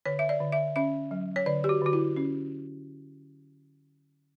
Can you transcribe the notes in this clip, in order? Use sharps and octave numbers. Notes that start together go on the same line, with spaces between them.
D3 C#5
E5
D5
D3
E5
C#4 E5
F#3
C#5
D3 D5
G4
F#4
D3 F#4
E4
C#4